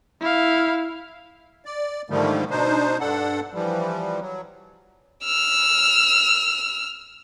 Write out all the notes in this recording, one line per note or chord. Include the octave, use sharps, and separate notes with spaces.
E4 F5
D5
G#2 D3 D#3 F3 G3 A3
B2 D4 D#4 C5
G2 D4 A4 F#5
E3 F3 G3
F#3
E6 F6